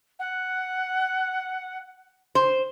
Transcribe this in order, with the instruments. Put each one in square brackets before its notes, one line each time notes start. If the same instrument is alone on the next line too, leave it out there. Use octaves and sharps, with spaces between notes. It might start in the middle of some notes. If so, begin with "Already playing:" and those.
[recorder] F#5
[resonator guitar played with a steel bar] C5